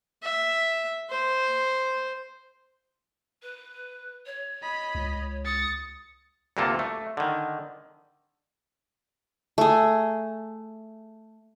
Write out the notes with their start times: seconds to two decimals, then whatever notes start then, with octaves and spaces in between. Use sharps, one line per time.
0.23 E5
1.10 C5
3.42 B4
4.26 C#5
4.62 D#5 B5
4.95 C#2
5.45 D#6 A6 C#7
6.57 D2 G2 C3 A#3 F4 A4
6.79 A3
7.17 D3 D#3
9.58 A3 G#4